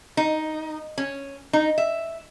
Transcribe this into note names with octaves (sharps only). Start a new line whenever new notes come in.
D#4
C#4
D#4
E5